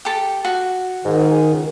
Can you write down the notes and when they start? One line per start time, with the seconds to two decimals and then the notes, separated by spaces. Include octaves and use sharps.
0.05 G4 A4
0.45 F#4
1.05 G#2 D#3
1.31 G#4
1.52 C#2